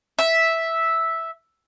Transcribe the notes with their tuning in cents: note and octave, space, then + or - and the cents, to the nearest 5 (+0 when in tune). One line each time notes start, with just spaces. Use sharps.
E5 -5